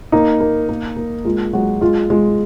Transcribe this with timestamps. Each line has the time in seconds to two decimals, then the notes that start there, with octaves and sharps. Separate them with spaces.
0.12 A#3 D#4
0.41 A#3
0.69 A#3
0.96 A#3
1.25 G#3 F4
1.53 F#3 G#3 F#4
1.81 G#3 F4
2.10 G#3 F4